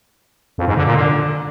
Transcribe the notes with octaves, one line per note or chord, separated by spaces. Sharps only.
F2
G#2
D3
A#2
D3